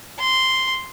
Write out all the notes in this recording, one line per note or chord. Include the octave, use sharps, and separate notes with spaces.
C6